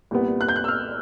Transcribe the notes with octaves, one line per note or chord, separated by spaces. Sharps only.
C2 A#2 G3 B3
F#6
G6
F#6
E6
F6